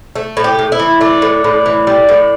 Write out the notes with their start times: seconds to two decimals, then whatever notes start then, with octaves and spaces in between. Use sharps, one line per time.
0.16 A3
0.37 A2
0.44 G4
0.59 A2
0.72 E4
0.79 E3
1.01 A3 D4
1.22 A2
1.44 A2
1.66 E3
1.87 G3
2.09 A2